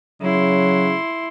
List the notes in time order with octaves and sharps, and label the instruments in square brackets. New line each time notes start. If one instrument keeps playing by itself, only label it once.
[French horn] C#3 [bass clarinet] F#3 [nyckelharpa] E4 C6